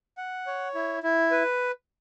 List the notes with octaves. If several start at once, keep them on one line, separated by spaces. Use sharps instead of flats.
F#5
C#5
E4
E4
B4